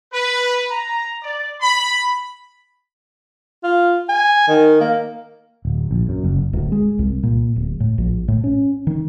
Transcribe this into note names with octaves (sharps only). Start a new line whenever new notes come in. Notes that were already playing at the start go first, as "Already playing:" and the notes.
B4
A#5
D5
B5
F4
G#5
D#3
A#3
D1
A#1
F#2
F#1
D1
G#3
C2
A#2
D1
A2
A#1
A2
C#4
D#3